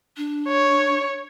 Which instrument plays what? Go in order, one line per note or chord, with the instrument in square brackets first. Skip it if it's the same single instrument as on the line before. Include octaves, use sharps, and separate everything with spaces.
[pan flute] D4
[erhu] C#5